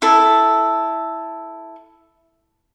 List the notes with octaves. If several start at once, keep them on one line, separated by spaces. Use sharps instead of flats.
E4 A4